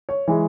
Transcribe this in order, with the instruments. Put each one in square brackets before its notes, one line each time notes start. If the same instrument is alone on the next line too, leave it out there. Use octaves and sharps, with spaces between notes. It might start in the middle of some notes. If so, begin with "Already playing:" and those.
[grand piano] C#5
E3 G#3